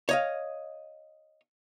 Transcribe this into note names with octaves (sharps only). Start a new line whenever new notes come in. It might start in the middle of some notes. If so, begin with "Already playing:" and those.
C#5 D#5 F5